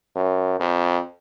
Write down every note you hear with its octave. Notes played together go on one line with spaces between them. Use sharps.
F#2
F2